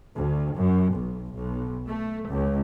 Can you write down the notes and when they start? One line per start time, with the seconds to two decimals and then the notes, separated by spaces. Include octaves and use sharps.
0.14 D2
0.55 F#2
0.92 B1
1.34 B1
1.88 A3
2.30 C#2